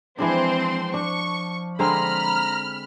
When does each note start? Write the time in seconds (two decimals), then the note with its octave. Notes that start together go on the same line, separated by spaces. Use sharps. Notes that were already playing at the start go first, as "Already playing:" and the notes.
0.18 E3 F3 G#3 C4 D4 C5 C6
0.94 D4 C#6
1.79 D3 G#3 C4 A#5 B5 F6